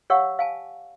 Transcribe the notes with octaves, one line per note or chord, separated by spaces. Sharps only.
G4 C#5 F5 F#5 C#6 E6
F5 G#5 A5